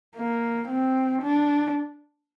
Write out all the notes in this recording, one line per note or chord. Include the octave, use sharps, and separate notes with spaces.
A#3
C4
D4